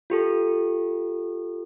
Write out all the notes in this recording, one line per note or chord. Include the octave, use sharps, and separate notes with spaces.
F4 G4 A4